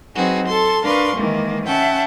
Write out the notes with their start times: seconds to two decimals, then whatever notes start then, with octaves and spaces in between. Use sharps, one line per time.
0.15 F#3 C4 D#4 F#4 G#4 B4
0.47 A4 A5 C6
0.83 D4 A#4 B4 F5 C6 C#6
1.15 D#3 E3 G#3 A#3
1.65 C#4 E5 F#5 G5 A5